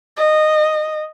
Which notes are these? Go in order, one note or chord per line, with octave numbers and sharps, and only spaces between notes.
D#5